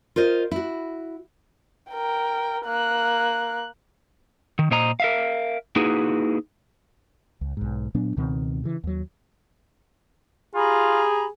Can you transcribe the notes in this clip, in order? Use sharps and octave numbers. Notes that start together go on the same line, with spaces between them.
F4 A#4 C5 D#5
E4 F#4
A#4 G5
A#3 F#6
D#3
A#2 C5 D#5 A#5
A#4 E5 F5
A#3 D#4 E4 F#4 G#4 B4
C#2
B1 G#2
A#2 F#3 B3 D4
C#2 B2 D#3 C4
C#3 E3
D#2 F#3
F4 G4 G#4 A#5 B5